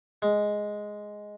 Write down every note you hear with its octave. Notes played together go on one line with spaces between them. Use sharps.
G#3